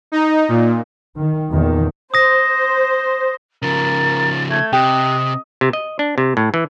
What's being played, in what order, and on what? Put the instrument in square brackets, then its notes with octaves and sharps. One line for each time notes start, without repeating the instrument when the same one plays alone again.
[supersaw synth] D#4
A#2
[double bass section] D#3
E2 A#2 D#3
[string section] C5 [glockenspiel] D#6 A#6
[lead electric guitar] C#3 F3 [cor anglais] A#4 [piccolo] A6
[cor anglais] A3 [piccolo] G#6
[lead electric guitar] C3 [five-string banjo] G4 [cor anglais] D#5 [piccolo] F#6
[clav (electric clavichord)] C3
D#5
D4
C3
A2
E3